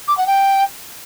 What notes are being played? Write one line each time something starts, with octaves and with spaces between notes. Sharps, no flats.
D6
F#5
G5